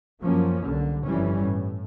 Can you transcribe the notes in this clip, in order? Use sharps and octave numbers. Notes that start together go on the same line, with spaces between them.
F#2 F3 F#3 A#3 C#4
C2 D3
G1 F2 E3 G3 C#4
A2